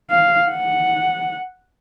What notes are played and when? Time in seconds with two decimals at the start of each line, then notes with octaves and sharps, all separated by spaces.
0.11 F5
0.51 F#5